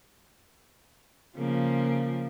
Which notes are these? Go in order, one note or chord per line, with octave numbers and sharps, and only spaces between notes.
C#3 F3 A#3